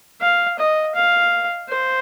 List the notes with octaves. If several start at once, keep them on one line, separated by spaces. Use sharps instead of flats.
F5
D#5
F5
C5